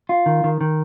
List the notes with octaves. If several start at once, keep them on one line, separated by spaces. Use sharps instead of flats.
F4
D#3
D#3
D#3